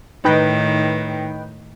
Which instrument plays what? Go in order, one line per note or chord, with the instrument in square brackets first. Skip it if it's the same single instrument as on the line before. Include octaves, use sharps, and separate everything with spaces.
[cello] A2 D#3 [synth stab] D#4 B4 G5